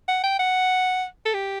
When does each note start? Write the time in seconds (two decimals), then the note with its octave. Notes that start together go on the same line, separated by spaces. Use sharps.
0.08 F#5
0.24 G5
0.39 F#5
1.25 A4
1.34 G4